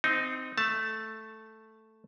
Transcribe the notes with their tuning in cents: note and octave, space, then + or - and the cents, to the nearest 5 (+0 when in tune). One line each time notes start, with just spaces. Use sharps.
C4 -15 D#4 +0
A3 +0 A5 +0